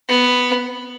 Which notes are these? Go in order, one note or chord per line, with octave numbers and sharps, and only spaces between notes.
B3